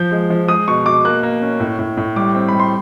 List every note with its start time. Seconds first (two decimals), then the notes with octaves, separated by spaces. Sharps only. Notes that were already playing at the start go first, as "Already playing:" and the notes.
Already playing: F3 G6
0.12 G#3
0.30 F3
0.48 G#3 D#6
0.68 B2 C#6
0.86 B2 D6
1.05 A#3 F#6
1.23 A#3
1.42 C#4
1.60 A2
1.79 A2
1.97 A2
2.16 G3 D6
2.34 C4
2.48 G3 B5
2.60 C6